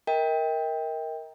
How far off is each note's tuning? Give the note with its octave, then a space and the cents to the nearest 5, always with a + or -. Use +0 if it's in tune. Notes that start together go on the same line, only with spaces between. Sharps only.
A#4 +0 D#5 +45 G5 +15